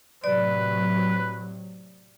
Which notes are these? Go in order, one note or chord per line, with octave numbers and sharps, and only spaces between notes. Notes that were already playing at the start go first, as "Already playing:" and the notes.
A2 C3 F#3 B4 D5